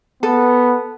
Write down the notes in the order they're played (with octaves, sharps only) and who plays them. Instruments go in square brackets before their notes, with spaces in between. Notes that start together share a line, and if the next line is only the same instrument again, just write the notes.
[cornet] B3 [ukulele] A4